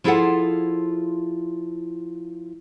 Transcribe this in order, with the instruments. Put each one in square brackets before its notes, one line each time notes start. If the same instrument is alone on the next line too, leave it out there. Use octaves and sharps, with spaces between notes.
[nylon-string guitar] F3 E4 F4 G#4 A4 F#5